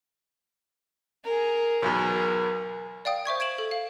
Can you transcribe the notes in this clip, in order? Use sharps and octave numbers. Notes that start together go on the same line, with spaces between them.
G#4 A#4
B1 E2 B2 G#4 A#4
D5 F5 G5 D#6
C5 E5 C#6 G#6
G#6 D7 E7 F#7
A4
F5